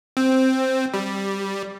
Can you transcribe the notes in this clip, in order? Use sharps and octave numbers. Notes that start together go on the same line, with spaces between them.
C4
G3